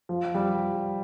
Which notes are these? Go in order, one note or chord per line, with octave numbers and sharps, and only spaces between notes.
F3
G3